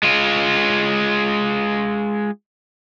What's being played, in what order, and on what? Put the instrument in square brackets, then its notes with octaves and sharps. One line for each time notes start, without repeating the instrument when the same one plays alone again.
[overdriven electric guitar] G#3 F4